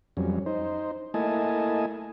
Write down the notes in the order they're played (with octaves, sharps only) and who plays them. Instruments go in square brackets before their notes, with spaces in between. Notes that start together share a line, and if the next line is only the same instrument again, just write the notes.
[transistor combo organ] F2 F#3 G3 C#4
D#4 C5
A3 A#3 E4 D#5 G#5 A5